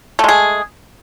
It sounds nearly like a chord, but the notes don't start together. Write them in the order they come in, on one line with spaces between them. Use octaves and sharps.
A3 G#3 G#4